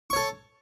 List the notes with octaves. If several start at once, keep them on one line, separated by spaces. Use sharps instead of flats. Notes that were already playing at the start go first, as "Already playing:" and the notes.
A4 C#5 C#6